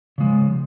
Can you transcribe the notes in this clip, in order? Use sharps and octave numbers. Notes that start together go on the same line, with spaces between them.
C#3 F3 G#3